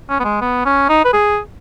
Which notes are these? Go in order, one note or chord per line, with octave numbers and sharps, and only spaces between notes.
C#4
B3
G#3
B3
C#4
D#4
B4
G#4